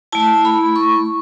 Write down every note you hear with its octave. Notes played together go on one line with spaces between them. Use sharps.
A3 E4 A5
B5
C#6